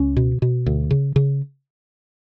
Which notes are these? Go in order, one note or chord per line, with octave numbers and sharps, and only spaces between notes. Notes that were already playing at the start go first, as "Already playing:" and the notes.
Already playing: C#2 C#4
B2
B2
D2
C#3
C#3